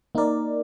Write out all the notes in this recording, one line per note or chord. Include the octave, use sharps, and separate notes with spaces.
A#3 D#4 A#4 D5